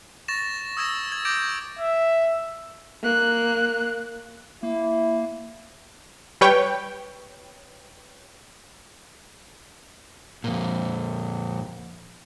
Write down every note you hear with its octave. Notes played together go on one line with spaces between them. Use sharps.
C#6 A6 A#6 E7
D#6 E6 G#6 A#6 E7
G#6
D6 G6 A#6 D7
E5
A#3 F#6
A#3 E4
G3 B4 C#5 G5
F2 A#2